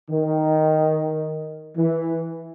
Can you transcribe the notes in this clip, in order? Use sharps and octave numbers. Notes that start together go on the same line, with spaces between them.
D#3
E3